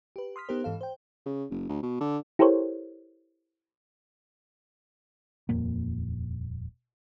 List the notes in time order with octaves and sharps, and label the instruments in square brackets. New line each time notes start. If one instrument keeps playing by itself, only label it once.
[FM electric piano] G4 B4
C6 D#6 F6 B6
B3 D#4 G4 A#4 C5
G#2 E3 A4 F5
C5 G5
[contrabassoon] C#3
F#1
D2
B2
D3
[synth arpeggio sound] E4 G4 A4 A#4 C5 C#5
[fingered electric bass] D#1 F2 A#2 A#3